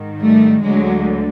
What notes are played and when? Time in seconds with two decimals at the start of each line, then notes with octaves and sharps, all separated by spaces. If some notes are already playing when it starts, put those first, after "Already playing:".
Already playing: G#2 D#3
0.20 G3 A3
0.63 D2 D3 F#3 G#3